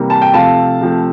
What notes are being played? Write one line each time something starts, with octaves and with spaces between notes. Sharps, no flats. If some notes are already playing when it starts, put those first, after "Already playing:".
Already playing: C3 E3 G3 A#3
A5
G5
C3 F3 A3 F5 A5
C3 F3 A3